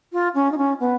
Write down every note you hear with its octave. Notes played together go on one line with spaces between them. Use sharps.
F4
C#4
D#4
C#4
B3